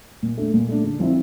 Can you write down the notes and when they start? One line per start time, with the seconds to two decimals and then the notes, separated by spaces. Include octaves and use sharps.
0.23 A#2
0.38 A3 D4
0.54 A#2
0.69 A3 D4
0.84 D3
1.00 F3 C4 E4